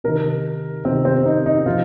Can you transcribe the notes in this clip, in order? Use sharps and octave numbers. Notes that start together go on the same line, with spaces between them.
C3 D#3 A#4
C3 D#3 C4
C4
D#4
D#4
C3 F3 F4